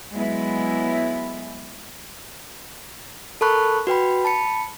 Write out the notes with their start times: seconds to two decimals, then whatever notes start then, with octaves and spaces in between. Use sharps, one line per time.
0.13 F#3 G#3 B3 E4
3.41 A4 A#4 A5 B5 C#6 F#6
3.87 F#4 B4 G5 B5
4.25 A5 B5 C#7